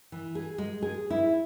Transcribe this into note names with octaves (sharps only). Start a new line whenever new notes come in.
E3
G#4
G#3
G#4
E4